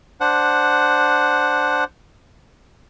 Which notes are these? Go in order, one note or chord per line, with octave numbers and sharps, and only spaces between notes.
D4 C5 F#5